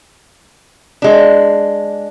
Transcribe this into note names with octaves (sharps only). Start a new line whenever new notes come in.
G#3 D4